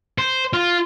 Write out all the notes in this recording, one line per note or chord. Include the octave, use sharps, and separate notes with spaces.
C5
F4